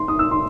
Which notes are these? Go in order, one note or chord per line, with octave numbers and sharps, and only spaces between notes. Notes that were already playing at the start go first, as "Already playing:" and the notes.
Already playing: C6
D#6
E6
C6